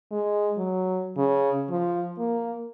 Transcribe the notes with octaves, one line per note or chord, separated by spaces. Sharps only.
G#3
F#3
C#3
F3
A#3